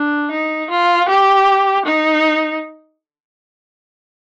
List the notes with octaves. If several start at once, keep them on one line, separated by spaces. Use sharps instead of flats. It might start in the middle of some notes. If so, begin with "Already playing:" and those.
Already playing: D4
D#4
F4
G4
D#4